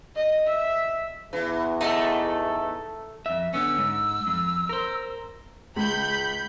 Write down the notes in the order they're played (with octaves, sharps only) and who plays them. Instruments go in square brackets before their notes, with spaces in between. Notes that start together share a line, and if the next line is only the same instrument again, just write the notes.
[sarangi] D#5
E5
[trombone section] E2 [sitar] E3
[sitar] A3 [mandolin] D#4 A4
[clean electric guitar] F2 E5
[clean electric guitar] D3 B3 C#4 [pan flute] E6
[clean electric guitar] G#2
F2
A#4 C5
[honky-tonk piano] C#2 [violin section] B5 G6